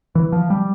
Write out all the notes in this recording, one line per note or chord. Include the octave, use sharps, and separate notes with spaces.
E3
F3
G3